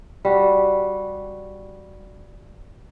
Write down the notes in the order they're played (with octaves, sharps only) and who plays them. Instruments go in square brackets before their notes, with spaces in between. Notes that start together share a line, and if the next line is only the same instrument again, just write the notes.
[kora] G3 F#4